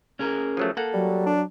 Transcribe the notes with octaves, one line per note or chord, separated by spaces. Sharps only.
C#4 G#4 A#4
F3 F#3 A3
A#3 A4 F#5
F#3 G3
D4